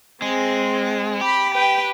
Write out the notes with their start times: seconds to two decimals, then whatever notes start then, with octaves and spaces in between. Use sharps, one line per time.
0.22 G#3 C4 G#4
1.21 G4 B5
1.54 B4 G5